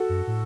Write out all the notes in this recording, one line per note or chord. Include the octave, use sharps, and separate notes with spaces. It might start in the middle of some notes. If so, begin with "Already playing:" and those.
Already playing: F#4 A4
F#2
A2